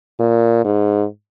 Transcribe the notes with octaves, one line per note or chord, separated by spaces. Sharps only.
A#2
G#2